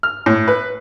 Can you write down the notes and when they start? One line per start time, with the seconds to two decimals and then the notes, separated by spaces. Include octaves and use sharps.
0.03 F6
0.26 A2
0.48 B4